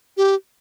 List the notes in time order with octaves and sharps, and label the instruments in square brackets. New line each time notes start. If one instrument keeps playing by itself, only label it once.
[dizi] G4